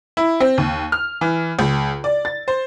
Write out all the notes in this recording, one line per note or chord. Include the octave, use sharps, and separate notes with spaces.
E4
C4
D#2
F6
E3
C#2
D5
A6
C5